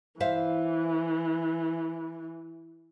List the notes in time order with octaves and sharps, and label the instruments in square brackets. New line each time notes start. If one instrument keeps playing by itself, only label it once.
[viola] E3 [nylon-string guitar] C5 E5 F5